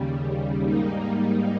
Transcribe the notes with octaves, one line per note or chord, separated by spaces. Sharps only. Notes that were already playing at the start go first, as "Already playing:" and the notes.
Already playing: D#2 C#3 G3
G#2 G3 A#3 D#4